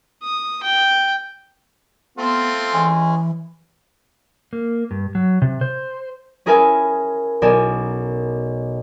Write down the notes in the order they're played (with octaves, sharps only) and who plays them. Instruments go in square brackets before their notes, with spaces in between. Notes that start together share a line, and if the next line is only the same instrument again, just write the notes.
[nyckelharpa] D#6
G5
[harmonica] A3 C4 F4 [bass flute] B3
[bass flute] E3 [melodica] G#3 C#4
[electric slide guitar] A#3
G2
F#3
C3
C5
[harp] C#4 G#4 A#4 B4 E5 G#5
B1 A#4 D5 G#5 E7